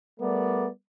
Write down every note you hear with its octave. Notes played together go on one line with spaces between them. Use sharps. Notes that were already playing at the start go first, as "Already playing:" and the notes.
G3 A3 B3 A#4 D5